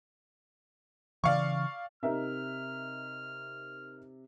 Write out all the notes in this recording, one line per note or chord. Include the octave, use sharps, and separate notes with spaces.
C#3 E3 D5 F5 C#6
C3 D#4 A#4 E5 F6